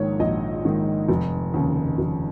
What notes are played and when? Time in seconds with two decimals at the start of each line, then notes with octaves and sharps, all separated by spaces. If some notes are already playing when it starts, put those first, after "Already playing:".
Already playing: A#1 G#2 D#3 C#5
0.19 A#1 D#5
0.65 G#2 D#3
1.09 F1
1.54 D#2 C#3
1.98 F1